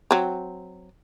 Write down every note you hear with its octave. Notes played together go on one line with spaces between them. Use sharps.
F#3 C4